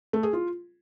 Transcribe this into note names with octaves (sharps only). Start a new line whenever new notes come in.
A3
G#4
F4